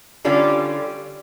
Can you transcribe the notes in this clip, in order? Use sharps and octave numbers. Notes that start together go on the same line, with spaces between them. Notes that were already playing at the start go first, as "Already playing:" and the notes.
D3 G3 C#4 F4